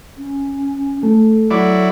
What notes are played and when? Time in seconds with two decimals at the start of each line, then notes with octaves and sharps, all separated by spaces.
0.18 C#4
1.03 A3 A4
1.50 F#3 E4 D5